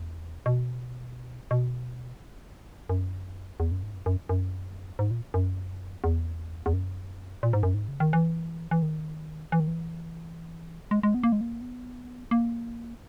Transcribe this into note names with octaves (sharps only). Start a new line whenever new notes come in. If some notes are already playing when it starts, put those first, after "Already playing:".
Already playing: E2
B2
B2
F#2
E2
F#2
G#2
F#2
F#2
F#2
G#2
A#2
F#2
E2
E2
F#2
A#2
G#2
F#2
G#2
C#3
D#3
E3
E3
D#3
E3
D#3
E3
G#3
G#3
B3
A#3
G#3
A#3
B3
A#3